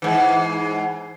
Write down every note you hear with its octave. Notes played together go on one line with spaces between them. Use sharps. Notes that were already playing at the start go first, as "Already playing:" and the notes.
G#2 E3